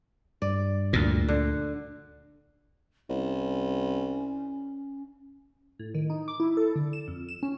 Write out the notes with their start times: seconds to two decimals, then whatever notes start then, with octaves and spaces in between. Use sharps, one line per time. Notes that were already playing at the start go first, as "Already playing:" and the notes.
0.42 G2 D5
0.93 D2 A#2
1.28 D3
3.09 C2 C#4
5.79 A2
5.95 D#3
6.10 D#4
6.28 D6
6.40 E4
6.57 A4
6.76 D3
6.93 E7
7.08 F2
7.29 E7
7.43 C#4